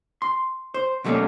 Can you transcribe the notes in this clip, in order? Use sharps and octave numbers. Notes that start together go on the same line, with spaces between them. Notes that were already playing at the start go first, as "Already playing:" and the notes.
C6
C5
B2 F#3 A3 A#3 C#4 D4